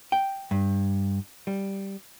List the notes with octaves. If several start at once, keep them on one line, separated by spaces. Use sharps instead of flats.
G5
G2
G3